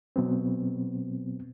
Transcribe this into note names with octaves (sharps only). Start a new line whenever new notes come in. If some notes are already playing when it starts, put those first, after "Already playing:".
B2 F#3 B3 C4